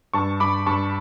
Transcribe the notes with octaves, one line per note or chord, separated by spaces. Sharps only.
G2 A5 C#6
G2 B5 D6
G2 A5 C#6